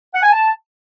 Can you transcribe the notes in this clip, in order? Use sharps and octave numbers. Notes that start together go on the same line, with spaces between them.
F#5
G#5
A5